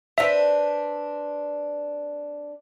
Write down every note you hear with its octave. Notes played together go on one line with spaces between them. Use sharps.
C4 D4 B4 E5